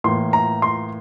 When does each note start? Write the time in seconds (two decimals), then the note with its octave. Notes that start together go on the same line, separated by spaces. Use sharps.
0.04 A2 E3 A#3 C6
0.33 A#5
0.62 C6